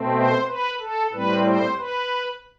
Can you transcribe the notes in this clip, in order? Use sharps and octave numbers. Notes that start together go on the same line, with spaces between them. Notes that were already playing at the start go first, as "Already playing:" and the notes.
Already playing: B2 A3 C4
C5
B4
A4
A2 G3 C4 B4
C5
B4